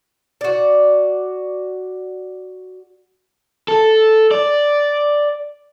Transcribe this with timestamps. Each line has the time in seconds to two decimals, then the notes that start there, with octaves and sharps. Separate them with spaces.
0.41 F#4 D5
3.68 A4
4.31 D5